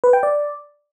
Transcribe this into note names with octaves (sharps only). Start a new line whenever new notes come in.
B4
G5
D5